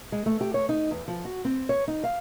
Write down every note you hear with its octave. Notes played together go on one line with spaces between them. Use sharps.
G#3
A3
G4
C#5
D#4
E2
F3
F#4
C4
C#5
D#4
F5